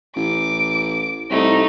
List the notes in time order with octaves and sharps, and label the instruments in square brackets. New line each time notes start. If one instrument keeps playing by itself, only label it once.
[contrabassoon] A1 [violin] D6
[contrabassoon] C2 [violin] A3 D#4